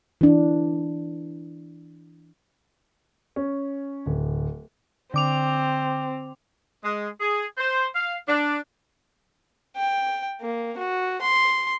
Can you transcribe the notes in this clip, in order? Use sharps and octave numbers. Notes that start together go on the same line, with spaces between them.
E3 D4
C#4
D1
D3 C4 D6 F7
G#3
G#4
C5
F5
D4
G5
A#3
F#4
C6